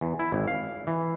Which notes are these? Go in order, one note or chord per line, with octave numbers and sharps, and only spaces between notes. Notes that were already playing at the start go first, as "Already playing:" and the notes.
E2
E4
G#1
F5
E3